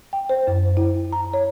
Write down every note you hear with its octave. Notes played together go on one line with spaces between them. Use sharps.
G5
C5
F#2
E4
A#5
C#5